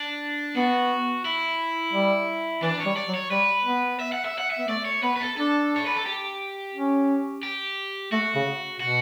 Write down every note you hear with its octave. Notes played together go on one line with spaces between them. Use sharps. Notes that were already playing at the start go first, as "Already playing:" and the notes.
Already playing: D4
B3 F#4
E4
G3
E3 D4
C#5
G3
D5
F#3
C#5
G3 B4
B3
E5
F#5
E5
F#5
E5
B3
A3 D5
C#5
B3 B4
B4
A4
D4 A4
C#5
B4
A4
G4
C#4
G4
A3 F#4
C#3
B2 F#4